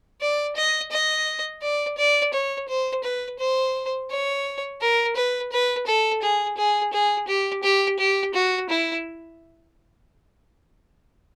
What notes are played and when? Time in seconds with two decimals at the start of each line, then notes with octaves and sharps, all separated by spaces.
0.21 D5
0.56 D#5
0.91 D#5
1.62 D5
1.97 D5
2.33 C#5
2.68 C5
3.03 B4
3.39 C5
4.10 C#5
4.81 A#4
5.16 B4
5.52 B4
5.87 A4
6.22 G#4
6.57 G#4
6.93 G#4
7.27 G4
7.63 G4
7.99 G4
8.34 F#4
8.69 E4